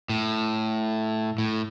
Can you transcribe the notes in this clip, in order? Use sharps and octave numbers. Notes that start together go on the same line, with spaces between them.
A2
A2